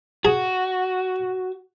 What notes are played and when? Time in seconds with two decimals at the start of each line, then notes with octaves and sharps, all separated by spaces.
0.25 F#4 G#4